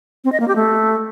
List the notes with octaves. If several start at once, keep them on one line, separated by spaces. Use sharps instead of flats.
C4
D#5
A#3
G4
A3